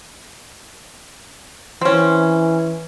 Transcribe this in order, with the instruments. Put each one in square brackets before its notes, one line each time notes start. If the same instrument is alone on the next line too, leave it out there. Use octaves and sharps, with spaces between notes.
[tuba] E3 [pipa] C4 C#4